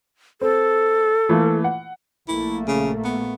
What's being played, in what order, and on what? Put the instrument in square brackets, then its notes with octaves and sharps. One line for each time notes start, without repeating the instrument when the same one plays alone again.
[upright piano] C4 [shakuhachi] A4
[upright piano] E3 A3 A#3
F#5
[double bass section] A#1 A3 A#3 [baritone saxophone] E4
[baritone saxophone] C#3
B3